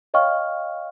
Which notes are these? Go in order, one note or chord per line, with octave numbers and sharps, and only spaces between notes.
C#5 D#5 F5 G5 C#6 F6